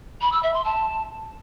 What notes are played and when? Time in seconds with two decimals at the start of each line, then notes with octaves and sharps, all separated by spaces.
0.21 B5
0.32 E6
0.43 E5
0.54 C6
0.65 A5